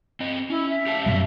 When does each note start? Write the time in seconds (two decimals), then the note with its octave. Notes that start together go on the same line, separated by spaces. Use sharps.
0.20 C4 D#5
0.50 C#4 E4
0.69 E5
0.87 G4 F5 A5
1.06 F#2 B2 G3